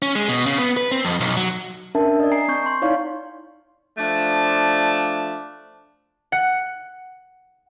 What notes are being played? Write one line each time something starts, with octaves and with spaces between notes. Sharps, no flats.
C#4
G#3
B2
C#3
B3
B4
C4
F2
B1
F#3
C#4 D4 A#4 E5 A5
D5 D#5
G#5 A#5 C7
C4 C#6 G6
C6
D#4 E4 C#5 D5 F5 C#6
F3 A3 D4
F#5